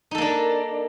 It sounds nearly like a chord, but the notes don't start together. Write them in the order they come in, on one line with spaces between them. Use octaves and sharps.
D#4 A4 A#3 D4